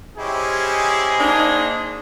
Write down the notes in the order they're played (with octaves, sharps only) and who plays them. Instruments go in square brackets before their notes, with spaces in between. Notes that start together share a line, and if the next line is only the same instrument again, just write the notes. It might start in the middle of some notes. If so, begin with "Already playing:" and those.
[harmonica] C#4 E4 G4 [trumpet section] G#4 C5 D#5
[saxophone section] A#3 D4 D#4